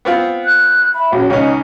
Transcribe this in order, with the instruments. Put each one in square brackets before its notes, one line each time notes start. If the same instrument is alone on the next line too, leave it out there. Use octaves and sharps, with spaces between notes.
[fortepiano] B3 C4 F4
[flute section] F#6 G6
E5 B5
[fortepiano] A#1 [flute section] C#4 F#4 C#5
[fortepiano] C#2 C#4 [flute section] D#4 D#5